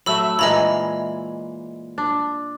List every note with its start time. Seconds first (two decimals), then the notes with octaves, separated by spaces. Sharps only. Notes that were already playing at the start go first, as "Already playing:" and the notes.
0.06 F#3 A3 E5 B5 E6
0.39 A#2 E3 G#3 D#5 A#5 B5
1.98 D4